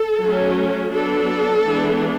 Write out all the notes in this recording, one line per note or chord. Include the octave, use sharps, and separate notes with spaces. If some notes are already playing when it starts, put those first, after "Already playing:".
Already playing: A4
F#3 A3 C#4
F#3 B3 D4 A4
E3 G#3 B3 D4